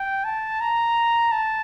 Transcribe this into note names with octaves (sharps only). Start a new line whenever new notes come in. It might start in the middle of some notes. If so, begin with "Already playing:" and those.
Already playing: G5
A5
A#5
A5